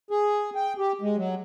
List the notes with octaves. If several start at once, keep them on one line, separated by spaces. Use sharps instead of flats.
G#4
G5
G4
G#3
F#3